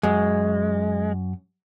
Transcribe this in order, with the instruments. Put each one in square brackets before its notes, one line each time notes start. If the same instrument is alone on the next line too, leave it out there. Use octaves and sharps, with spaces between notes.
[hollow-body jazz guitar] F#2 [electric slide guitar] G#3